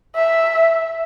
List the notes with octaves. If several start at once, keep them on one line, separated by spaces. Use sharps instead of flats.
E5